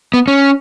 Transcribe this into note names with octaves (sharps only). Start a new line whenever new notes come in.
B3
C#4